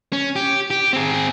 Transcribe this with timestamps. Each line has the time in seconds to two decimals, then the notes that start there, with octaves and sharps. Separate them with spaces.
0.13 C#4
0.36 G4
0.70 G4
0.93 C4 G#4